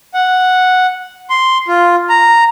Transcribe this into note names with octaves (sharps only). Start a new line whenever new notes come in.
F#5
C6
F4
A#5